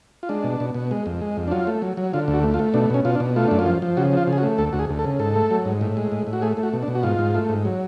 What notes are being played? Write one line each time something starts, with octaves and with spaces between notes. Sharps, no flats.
F4
G#3 D4
B2
B2
B2
G#3
F2
G#3
F2
D4
F#3 F4
A3
F#3
F#3
D3 F4
D2
F#4
A3
F4
A3
B2 D4
B2 C#4
B2 F4
D4
B2
A3 F4
F#2 D4
F4
F3
F3
C#3 F#4
F3 F4
C#3
G#4
F#4
A3
D2 A4
D2 F#4
G#4
D2
A4
C#3
G#2 A4
A3
F#3
G#2
A2
G#3
A2
A2
F#4
A3 G#4
A3
F#4
B2
D4
B2
F#4
G#2 F4
G#2
A3
G#2
F#3